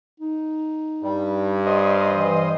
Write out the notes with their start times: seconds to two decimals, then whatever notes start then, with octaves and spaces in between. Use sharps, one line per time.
0.20 D#4
1.03 G2 G3
1.66 C5 D#5
2.10 E3